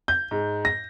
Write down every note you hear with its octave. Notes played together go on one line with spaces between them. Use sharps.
G6
G#2
A#6